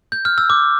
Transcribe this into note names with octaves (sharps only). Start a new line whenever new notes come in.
G6
F6
E6
D6